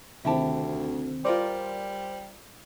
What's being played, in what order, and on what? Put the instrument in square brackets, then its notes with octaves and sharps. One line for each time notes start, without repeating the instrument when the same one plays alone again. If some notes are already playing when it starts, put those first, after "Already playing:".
[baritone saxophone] D2 [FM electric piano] C3 D#3 C4 [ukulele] E4 G4 A5
[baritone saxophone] G3 [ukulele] F4 A#4 D5 [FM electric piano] C5